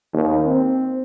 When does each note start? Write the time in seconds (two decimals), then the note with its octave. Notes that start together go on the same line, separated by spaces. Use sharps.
0.14 D#2
0.46 C4